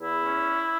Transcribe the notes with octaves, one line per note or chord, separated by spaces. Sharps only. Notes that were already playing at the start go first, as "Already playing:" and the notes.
E2 E4
C#4